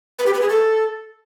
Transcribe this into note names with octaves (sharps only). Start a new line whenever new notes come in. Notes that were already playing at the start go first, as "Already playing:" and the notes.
B4
G4
B4
G#4
A4